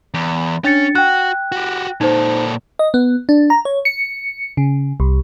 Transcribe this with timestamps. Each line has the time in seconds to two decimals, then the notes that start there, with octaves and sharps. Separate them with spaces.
0.14 E2
0.65 C#4 D4 A6 C#7
0.95 F#4 G5 F#6
1.52 F#4 G4
2.01 A#2 D#4 A4 C5
2.79 D#5
2.94 B3
3.29 D4
3.50 A#5
3.65 C#5
3.85 C#7
4.57 C#3
5.00 C2